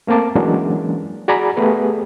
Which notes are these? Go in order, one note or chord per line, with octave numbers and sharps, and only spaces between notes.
A3 A#3 C4 A5 D6
E3 F#3 G#3 A#3 C#4 D4
F#4 G#4 D5 G#5 A#5 B5
A3 B3 G4 G#4 B4